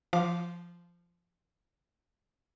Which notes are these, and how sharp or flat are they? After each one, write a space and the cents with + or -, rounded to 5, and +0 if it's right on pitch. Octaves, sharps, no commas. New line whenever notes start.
F3 -10 F5 +0 D6 +0